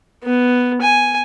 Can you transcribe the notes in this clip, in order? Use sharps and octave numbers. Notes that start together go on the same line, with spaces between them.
B3
G#5